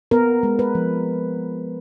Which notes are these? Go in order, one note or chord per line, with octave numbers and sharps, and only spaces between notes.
B3 A#4
G#3
B4
F3